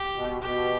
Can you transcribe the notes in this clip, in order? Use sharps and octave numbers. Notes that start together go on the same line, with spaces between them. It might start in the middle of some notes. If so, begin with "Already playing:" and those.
Already playing: G4
B2
B2 G4